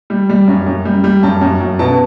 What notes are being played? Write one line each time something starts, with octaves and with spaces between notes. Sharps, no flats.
G3
G3
F#2
F#2
G3
G3
F#2 A5
F#2
F#2
B2 A5